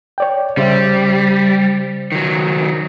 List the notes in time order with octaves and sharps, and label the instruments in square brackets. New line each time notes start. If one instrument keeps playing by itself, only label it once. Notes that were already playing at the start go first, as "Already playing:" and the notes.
[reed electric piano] C#5 D5 G5
[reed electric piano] C#3 C5 E5 [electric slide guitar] G3
[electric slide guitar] D#3 F#3